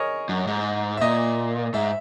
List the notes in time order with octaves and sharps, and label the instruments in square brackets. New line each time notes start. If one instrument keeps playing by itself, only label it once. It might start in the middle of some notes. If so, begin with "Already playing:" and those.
Already playing: [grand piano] G#4 A#4 C#5 D#5
[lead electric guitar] F#2
G#2
[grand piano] E5
[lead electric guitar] A#2 [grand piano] D#5
[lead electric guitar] G#2 [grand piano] E5